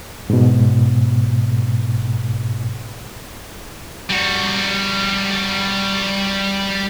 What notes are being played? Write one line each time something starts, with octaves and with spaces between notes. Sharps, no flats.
G#2 B2
G3 F#4